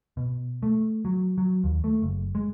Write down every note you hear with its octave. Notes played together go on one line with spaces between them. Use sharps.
B2
A3
F#3
F#3
D#2
A3
F#1
G#3